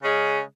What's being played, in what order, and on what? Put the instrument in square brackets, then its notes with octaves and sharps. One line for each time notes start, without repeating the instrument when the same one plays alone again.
[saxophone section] C#3 G#3 C#4 G#4